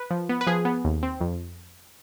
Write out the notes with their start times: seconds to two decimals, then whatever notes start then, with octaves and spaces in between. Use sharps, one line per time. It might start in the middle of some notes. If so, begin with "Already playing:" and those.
Already playing: B4
0.11 F3
0.29 B3
0.41 B4
0.47 F3 G#4
0.65 B3
0.85 D#2
1.03 C4
1.20 F2